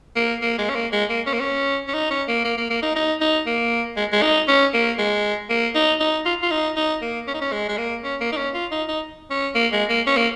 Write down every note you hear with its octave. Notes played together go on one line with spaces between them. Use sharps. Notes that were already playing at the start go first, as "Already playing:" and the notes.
A#3
A#3
G#3
C#4
A#3
G#3
A#3
C#4
A#3
C#4
C#4
D#4
C#4
A#3
A#3
A#3
A#3
D#4
D#4
D#4
A#3
G#3
G#3
D#4
C#4
A#3
G#3
A#3
D#4
D#4
F4
F4
D#4
D#4
A#3
C#4
D#4
C#4
G#3
G#3
A#3
C#4
A#3
D#4
C#4
F4
D#4
D#4
C#4
A#3
G#3
A#3
C#4
A#3